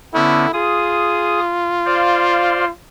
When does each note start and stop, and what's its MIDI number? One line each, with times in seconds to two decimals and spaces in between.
0.14 0.46 50
0.14 0.46 59
0.14 0.46 61
0.14 0.53 64
0.53 2.72 65
0.53 1.40 68
0.53 1.40 87
1.86 2.65 72
1.86 2.65 74
1.86 2.65 77